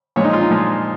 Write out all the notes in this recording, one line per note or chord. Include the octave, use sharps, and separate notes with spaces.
A#2 F3 G#3 C#5
D#4
F4
D#4
A#2 F3 G#3